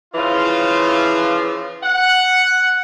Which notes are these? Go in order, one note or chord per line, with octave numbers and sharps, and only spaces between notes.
C#3 E3 F3 F4
F#5